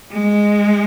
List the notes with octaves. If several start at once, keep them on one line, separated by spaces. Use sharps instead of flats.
G#3